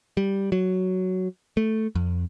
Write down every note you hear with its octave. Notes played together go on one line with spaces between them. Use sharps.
G3
F#3
A3
F2